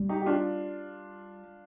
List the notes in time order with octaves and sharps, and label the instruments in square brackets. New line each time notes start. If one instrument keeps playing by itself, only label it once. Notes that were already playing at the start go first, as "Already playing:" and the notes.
Already playing: [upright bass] G3
[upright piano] D#4 G4
G4
D4 F4